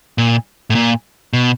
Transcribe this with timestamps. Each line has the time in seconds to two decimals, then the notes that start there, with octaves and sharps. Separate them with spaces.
0.18 A#2
0.70 A2
0.75 A#2
1.33 B2